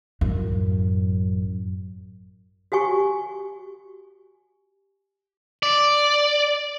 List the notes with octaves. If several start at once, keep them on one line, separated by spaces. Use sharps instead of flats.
A1 F#2
F#4 G4 G#5 C#6
D5